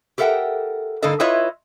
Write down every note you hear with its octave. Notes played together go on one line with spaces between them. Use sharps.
G4 A4 A#4 E5 F#5 G5
G2 D3 A#3 D#4 A4 D#5
E4 F4 B4 C#5 D#5 E5